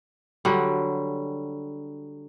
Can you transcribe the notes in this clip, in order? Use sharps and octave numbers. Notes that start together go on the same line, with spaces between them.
D3 F#3 G3